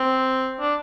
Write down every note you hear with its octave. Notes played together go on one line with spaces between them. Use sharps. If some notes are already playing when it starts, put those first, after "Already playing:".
Already playing: C4
D4